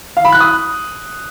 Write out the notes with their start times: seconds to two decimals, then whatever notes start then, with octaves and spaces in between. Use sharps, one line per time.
0.17 F5
0.25 B5
0.32 F#6
0.40 D#6